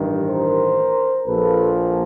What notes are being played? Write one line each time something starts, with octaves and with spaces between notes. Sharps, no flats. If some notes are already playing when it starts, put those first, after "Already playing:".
Already playing: A1 G2 D#3
A#4 C5
A#1 A#2 F3 A4 B4